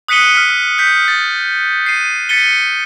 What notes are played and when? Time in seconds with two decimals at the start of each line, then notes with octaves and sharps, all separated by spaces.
0.08 D#6 F#6 B6 C#7 D#7 G7
0.35 F6 B6
0.78 F6 G6 B6
1.08 A6
1.86 C7 D#7
2.29 A6 B6 C#7 D#7 G7